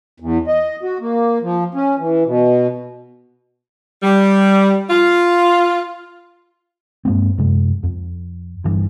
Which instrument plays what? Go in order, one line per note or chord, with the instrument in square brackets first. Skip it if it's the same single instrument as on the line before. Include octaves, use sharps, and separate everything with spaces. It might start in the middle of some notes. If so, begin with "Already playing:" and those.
[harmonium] E2
D#5
F#4
A#3
F3
C#4
E3
B2
[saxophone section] G3
F4
[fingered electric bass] G2 G#3 A#3 C4
F#2 C3 G#3
F2
G1 G2 E3